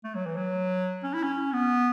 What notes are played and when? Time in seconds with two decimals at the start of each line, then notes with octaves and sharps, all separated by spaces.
0.04 A3
0.15 F#3
0.26 E3
0.36 F#3
1.03 C#4
1.14 E4
1.23 C#4
1.53 B3